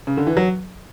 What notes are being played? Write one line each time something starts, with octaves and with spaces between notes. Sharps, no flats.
C#3
D3
E3
F#3